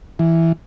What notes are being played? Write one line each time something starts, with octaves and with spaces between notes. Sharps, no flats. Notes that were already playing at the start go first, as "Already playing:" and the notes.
E3